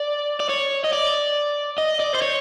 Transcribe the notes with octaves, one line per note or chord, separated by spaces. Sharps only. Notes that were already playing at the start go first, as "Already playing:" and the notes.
Already playing: D5
D5
C#5
D#5
D5
D#5
D5
C5
C#5